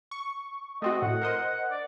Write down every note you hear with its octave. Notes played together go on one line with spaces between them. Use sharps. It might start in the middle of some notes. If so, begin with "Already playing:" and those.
C#6
A3 C4 F#4 D#5
A2 F#5
A#4 C5 D#5
D5